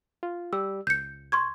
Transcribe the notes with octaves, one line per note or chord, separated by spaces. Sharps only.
F4
G3 G4 D5 E6
C#2 G6 C#7
C6 C#6 G#6